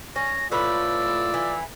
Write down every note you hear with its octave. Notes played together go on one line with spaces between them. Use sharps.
C#4 A#6
A2 F4 B4 D5 E6
E3